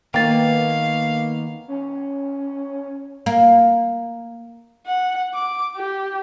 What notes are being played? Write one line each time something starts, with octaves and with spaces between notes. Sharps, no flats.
D#3 A#3 B3 B4 F5 G5 A6
C#4
A#3
F#5
D6
G4